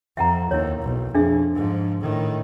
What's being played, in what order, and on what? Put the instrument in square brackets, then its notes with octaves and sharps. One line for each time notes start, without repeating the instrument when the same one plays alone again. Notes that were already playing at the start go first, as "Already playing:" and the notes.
[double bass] F2 [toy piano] E5 F#5 A#5
[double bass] D#2 [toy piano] E4 C#5
[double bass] B1
[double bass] F2 [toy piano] D4 G#4 E5
[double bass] G#2 F3
A2 D#3